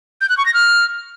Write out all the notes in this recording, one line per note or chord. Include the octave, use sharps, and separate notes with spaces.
G6
F#6
C#6
A#6
F6